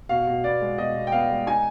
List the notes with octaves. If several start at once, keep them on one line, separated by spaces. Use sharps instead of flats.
B2 F5
B2
B3 D5
G#3
B2 D#5
B2
G5
B3 F5
G#3
D#4 G#5